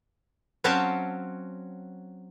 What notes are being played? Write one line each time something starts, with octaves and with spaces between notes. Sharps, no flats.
F#3 C4 C#4 F5 G5 A5